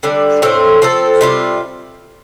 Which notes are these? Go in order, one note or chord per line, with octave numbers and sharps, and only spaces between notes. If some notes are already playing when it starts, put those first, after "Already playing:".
D3 G3 D4
A2 A3 C4
F3 C4 A4
C3 G3 F4